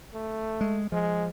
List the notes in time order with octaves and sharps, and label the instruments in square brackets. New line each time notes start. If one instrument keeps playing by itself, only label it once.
[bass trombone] A3
[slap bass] G#3
[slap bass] F3 [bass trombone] G#3